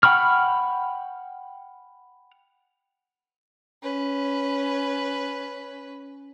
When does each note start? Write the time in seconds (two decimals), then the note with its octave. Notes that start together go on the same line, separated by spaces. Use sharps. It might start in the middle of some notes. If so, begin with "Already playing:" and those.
0.03 F#5 G5 B5 C#6 F6
3.83 C#4 B4